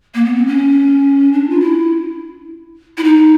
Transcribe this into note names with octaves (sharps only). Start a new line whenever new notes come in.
A#3
B3
C4
C#4
D4
F4
E4
E4
D#4